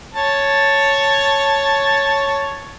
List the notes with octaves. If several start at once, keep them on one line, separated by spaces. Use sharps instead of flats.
C#5 A5